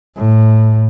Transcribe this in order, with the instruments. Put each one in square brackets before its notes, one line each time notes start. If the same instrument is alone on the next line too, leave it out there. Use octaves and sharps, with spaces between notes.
[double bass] A2